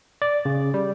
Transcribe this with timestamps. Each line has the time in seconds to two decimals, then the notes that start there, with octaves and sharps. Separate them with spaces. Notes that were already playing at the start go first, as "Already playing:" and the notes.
0.22 D5
0.45 C#3
0.74 G3